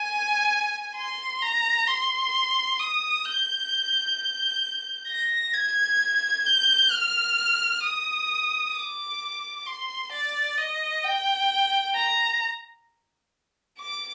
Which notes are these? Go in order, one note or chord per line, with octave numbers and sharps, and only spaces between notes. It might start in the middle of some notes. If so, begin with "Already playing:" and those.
Already playing: G#5
C6
A#5
C6
D#6
G6
A#6
G#6
G6
F6
D#6
D6
C6
D5
D#5
G5
A#5
D6